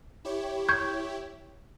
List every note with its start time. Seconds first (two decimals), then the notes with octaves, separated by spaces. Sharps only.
0.25 E4 G4 C#5
0.69 C#6 G6 G#6